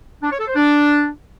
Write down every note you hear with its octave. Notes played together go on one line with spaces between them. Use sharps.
D4
C#5
A4
C5
D4